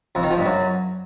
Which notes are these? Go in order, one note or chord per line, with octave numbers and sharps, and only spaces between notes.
F2
D#3
F3
G2
F#2